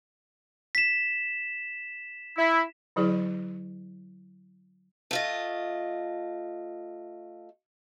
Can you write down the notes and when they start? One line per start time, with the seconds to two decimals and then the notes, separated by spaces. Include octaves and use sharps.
0.75 B6 E7
2.38 E4
2.96 D3 F#3 E4 G#4 D5
5.11 A3 F4 D#5